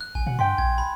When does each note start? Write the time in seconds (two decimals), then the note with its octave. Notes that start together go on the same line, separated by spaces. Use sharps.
0.01 F#6
0.15 A1 G#5
0.27 B2 F#5
0.39 G2 G5 C6 B6
0.58 A#1 G#6
0.78 B5